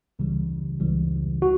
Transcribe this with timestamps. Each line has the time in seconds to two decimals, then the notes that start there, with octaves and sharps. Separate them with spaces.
0.19 C#2 C#3 E3 G3
0.80 C#2 C#3 E3 G3
1.42 F#4